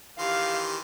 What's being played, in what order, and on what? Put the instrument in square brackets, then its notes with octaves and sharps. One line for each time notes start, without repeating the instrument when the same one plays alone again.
[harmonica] D#3 E3 C6 [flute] G4 [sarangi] F5